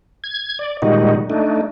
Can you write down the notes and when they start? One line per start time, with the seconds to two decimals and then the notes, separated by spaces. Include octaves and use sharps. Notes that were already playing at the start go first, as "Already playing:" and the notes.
0.24 G#6
0.59 D5
0.82 A#2 D#3 G3 G#3 D#4 F#4
1.30 A3 D4 D#4